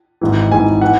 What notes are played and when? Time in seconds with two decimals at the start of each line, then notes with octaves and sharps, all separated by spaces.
0.21 G#1 G#2 E3
0.52 G#1 G#2 E3 G#5
0.82 E3 F#5